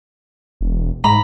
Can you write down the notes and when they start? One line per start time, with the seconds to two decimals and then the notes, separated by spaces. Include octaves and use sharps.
0.61 E1
1.04 G#2 A#5 B5